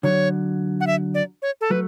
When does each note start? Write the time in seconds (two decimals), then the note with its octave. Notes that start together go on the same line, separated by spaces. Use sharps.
0.03 D3 F#3 C#5
0.80 F#5
0.87 E5
1.14 D5
1.42 C#5
1.61 A4
1.70 F#3 A3 B4